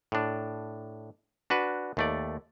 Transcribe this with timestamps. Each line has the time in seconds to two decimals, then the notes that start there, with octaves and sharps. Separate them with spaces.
0.12 A2 D4
1.50 D4 F#4 B4
1.97 D#2 A3 D5